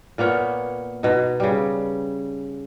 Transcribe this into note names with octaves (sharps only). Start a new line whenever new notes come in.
A#2 A#3 B3 C#5
B2 D#4
C#3 G3